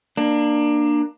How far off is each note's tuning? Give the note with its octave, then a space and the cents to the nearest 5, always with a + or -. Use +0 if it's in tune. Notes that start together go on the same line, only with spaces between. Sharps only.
A#3 +0 D4 +20